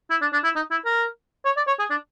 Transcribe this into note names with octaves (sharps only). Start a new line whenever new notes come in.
E4
D4
D4
E4
D#4
E4
A#4
C#5
D5
C#5
G#4
D4